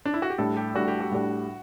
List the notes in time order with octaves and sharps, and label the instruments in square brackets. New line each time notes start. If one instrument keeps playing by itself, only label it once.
[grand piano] D4
E4
F#4
G4
[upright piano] A2 G3 D4 [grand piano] A4
[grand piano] G4
[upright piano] A2 G3 D4 [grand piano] F#4
[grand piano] G4
F#4
[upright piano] A2 G3 D4